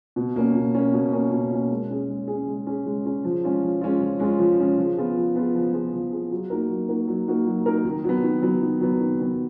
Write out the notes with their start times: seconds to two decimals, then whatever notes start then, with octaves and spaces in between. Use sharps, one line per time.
0.16 B2
0.36 A#3 C#4
0.55 B2
0.75 A#3 C#4
0.93 B2
1.13 A#3 C#4
1.32 B2
1.52 A#3 C#4
1.71 G#3
1.90 C#4 G#4
2.09 G#3
2.28 C#4 G#4
2.47 G#3
2.67 C#4 G#4
2.86 G#3
3.05 C#4 G#4
3.24 F3
3.44 G#3 C#4 F4
3.62 F3
3.81 G#3 C#4 F4
4.01 F3
4.19 G#3 C#4 F4
4.39 F3
4.59 G#3 C#4 F4
4.78 F3
4.97 B3 F4 G#4
5.17 F3
5.36 B3 F4 G#4
5.55 F3
5.73 B3 F4 G#4
5.94 F3
6.12 B3 F4 G#4
6.31 F#3
6.50 A#3 D#4 F#4 A#4
6.70 F#3
6.89 A#3 D#4 F#4 A#4
7.08 F#3
7.28 A#3 D#4 F#4 A#4
7.46 F#3
7.66 A#3 D#4 F#4 A#4
7.85 D#3
8.04 F#3 B3
8.23 D#3
8.42 F#3 B3
8.62 D#3
8.81 F#3 B3
9.01 D#3
9.19 F#3 B3